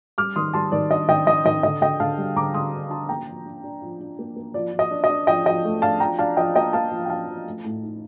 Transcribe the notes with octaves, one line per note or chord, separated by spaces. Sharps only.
G3 D6 F6
D#3 C6 D#6
G3 A5 C6
D#3 D5
D4 D#5
D#3 D#5 G5
D#3 D#5
D#3 D#5
D3 D#5
D3 D#5 G5
D3 F5 A5
G3
D3 A#5 D6
D3 C6 D#6
D4
D4 A5 C6
A#3 G5 A#5
F3
D4
D4
F3
D4
A#3
A#3
F3 D5
F3
D#5
D4
D#5
D4
F3 D#5 G5
F3 D#5 G5
A3
D4 F5 A5
F3 G5 A#5
D4 F5 A5
F3 D#5 G5
A#3 D#5 G5
A#3 F5 A5
F3
G5
D4 F5 A5
F3
A3
A2
D#4